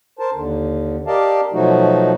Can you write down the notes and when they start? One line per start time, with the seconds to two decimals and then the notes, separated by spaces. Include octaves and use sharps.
0.19 A#4 C5 A5
0.34 D#2 D3
1.07 G4 A#4 D5 D#5 F5 A5
1.53 B2 F3 F#3 A3 D#4 F#4